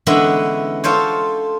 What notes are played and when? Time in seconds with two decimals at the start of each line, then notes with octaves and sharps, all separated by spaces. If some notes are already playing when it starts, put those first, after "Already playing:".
0.07 D3 E3 G#3 B3 C#4 E4
0.84 F4 A4 C5 C#5